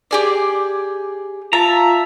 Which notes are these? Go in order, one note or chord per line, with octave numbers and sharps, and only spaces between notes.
G4 G#4 D5
F4 E5 A5 A#5